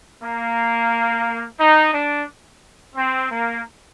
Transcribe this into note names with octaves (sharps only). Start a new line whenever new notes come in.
A#3
D#4
D4
C4
A#3